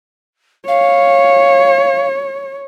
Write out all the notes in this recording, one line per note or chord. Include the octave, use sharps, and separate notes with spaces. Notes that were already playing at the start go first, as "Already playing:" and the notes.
C#5 F5